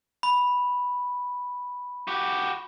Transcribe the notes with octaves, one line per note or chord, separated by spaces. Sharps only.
B5
F#4 G4